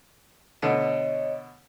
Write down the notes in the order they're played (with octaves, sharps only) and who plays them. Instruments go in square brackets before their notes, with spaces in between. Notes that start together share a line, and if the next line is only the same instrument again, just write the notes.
[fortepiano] B2 D3 A3 [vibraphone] C#5 D#5